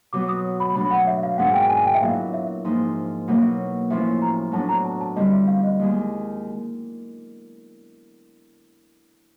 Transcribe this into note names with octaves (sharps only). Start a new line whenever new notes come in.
B2 F#3 B3 D6
D#6
B5
B2 F#3 A3 D4 B5
F#5
E5
F5
G#2 D#3 G#3 B3 D4 F#5
G5
G#5
G5
E5
A#2 F#3 B3 E4 F5
E5
G#2 F3 A#3 D#4
B2 F#3 A#3
A2 F3 A3 C#4 E4 E5
A#5
A2 F#3 B3 D4 A5
A#5
A5
A5
D3 G3 C4 E4 D#5
E5
F5
D#5
D#2 D#3 G#3